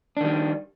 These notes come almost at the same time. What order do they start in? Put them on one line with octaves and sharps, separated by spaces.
D4 D#3 G3